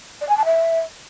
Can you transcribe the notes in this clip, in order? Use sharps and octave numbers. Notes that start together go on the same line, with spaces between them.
D5
G#5
A5
E5